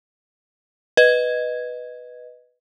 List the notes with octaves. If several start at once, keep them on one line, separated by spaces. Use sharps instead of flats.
B4 D#5 G#6